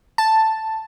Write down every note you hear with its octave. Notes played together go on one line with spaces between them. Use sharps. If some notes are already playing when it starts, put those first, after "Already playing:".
A5